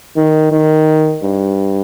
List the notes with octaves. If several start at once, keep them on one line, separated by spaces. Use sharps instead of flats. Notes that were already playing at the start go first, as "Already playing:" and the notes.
D#3
D#3
G2